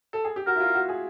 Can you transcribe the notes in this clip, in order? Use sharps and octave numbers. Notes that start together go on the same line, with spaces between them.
A4
G#4
G4
F#4 A#4
E4
F4
F#4
G#4